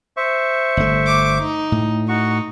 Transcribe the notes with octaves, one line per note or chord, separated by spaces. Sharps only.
C5 E5 C#6
G1 A3
D6
D#4
A2
D#4 F#4 C#6